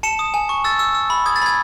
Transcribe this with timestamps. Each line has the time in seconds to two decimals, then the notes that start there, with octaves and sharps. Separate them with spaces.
0.03 A5 C#7 E7
0.19 D#6
0.34 G#5
0.49 C#6
0.64 E6 A6
0.79 E6
0.95 E6
1.10 B5
1.26 D#6 G#6
1.36 A6
1.42 B5 G#6